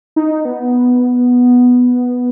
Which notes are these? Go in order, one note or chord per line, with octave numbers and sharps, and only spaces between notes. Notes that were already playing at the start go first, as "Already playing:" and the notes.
D#4
B3